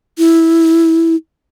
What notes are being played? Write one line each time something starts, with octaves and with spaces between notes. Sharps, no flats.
E4